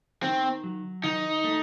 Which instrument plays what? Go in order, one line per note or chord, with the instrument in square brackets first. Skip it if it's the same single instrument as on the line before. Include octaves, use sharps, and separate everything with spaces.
[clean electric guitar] D#3 [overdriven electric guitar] C4
[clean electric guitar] F#3
[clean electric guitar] D#3 [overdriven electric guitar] D#4
[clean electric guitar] A3